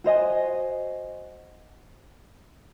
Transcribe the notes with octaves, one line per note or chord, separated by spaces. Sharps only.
F#4 C5 D#5 G#5